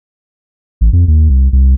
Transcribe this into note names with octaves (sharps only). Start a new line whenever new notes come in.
A1
F2
D#2
C2
C2